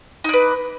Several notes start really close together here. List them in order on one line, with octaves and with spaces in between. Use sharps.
D#4 D5 B4